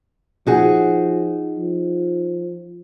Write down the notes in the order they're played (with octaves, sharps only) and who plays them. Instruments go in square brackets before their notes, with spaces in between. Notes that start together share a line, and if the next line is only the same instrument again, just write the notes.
[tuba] F3 [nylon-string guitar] D#4 F#4 G#4
[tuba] F3